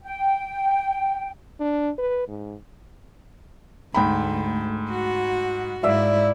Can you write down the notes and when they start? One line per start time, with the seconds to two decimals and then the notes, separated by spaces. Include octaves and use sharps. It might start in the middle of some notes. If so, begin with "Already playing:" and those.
0.03 G5
1.60 D4
1.98 B4
2.28 G#2
3.94 D2 G#2 A3 G5 B5
4.90 F#4
5.83 G#2 E4 D5 E5 F5